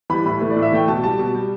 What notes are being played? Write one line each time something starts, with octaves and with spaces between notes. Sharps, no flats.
E3 G3 B5
A2 B5
E3 A3
D5
A2
E5
E3 A3 G5
B2 A5
G3 A5
B2
G3